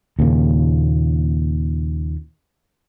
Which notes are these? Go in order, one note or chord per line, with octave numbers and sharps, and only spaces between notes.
D#2 A#2 C#3